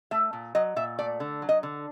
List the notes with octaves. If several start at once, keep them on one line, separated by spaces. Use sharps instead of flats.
A3 E5
A#2
F#3 D#5
A#2 E5
A3 D5
D3
F#3
D#5
D3